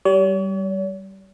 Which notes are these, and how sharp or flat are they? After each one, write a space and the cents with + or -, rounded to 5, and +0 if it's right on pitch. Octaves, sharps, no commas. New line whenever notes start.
G3 -15 C#5 +45